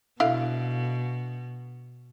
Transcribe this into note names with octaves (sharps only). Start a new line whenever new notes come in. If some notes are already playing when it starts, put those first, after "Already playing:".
B2 D3 E4 F5